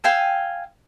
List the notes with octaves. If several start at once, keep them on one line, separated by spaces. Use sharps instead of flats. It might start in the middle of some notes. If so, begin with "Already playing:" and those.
F5 G5 G#5 E6